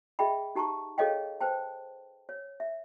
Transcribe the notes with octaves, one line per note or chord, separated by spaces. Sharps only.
G#4 D#5 E5 G5 B5
D#4 G4 A5 A#5 C#6
G#4 A4 C#5 D#5 F5 G5
B4 C5 G5 A5
C#5
E5